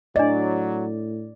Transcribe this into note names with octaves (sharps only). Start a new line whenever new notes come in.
A2 F#3 D4 D5 D#5